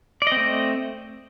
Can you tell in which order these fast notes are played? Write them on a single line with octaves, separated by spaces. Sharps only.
D5 D#5 C4 A3